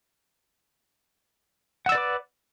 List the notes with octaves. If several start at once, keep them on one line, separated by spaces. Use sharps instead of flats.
B4 D5 F#5 D6 E6